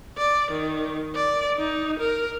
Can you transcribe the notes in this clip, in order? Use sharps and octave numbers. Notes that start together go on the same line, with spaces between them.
D5
D#3
D5
D#4
A#4